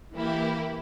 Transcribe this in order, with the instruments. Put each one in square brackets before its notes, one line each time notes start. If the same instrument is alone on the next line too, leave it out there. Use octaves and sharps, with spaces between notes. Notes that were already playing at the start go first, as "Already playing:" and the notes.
[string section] E3 A#3 E4 G4